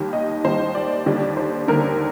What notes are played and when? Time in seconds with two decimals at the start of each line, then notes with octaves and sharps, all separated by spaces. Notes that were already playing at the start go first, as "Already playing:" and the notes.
Already playing: D#2 D#3 G3
0.13 D#5
0.44 D#2 D#3 G3 C5
0.75 D5
1.06 D#2 D3 G3 D5
1.37 C5
1.68 D#2 D3 G3 A#4